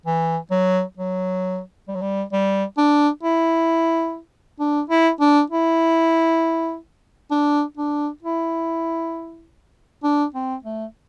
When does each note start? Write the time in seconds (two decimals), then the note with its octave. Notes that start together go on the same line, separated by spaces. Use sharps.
0.06 E3
0.51 F#3
0.97 F#3
1.88 G3
1.95 F#3
2.02 G3
2.33 G3
2.78 D4
3.23 E4
4.60 D4
4.89 E4
5.20 D4
5.50 E4
7.31 D4
7.77 D4
8.22 E4
10.04 D4
10.34 C4
10.64 A3